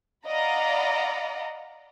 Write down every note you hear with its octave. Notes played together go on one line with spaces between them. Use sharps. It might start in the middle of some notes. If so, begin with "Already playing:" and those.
D5 D#5 F5 F#5 A#5 B5